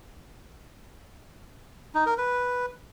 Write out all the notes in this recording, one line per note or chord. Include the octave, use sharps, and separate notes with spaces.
D#4
A#4
B4